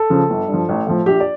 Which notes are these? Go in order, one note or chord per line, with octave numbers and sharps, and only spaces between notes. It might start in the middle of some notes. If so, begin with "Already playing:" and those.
Already playing: A4
C#3 F3
G1
G2
F3
A1
A2 F3
A#1 G4
D5